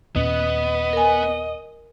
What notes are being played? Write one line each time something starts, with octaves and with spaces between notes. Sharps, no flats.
D#2 A#2 B3 C#4 D#5
A#4 G#5